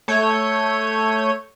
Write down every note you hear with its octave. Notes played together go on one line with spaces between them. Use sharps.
A3 C#5 G6 D#7